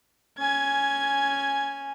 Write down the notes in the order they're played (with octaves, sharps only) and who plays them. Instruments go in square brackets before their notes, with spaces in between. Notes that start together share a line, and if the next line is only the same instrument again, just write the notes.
[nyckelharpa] C#4 G#5 [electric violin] G#6